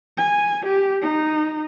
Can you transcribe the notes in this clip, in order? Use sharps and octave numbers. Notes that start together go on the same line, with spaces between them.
G#5
G4
D#4